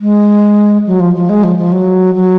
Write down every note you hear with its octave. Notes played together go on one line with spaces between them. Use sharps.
G#3
F#3
F3
F3
G#3
F3
F3
F#3
F#3